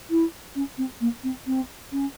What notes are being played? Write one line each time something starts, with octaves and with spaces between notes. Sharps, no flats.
E4
C#4
C4
A#3
C4
C4
C#4